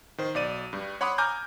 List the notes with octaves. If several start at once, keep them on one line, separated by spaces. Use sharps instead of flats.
D#3 C5
B1 D5 D#7
G2 G3
C#5 F#5 B5 C6 D6 D#6
G#5 A#5 D6 F6 G6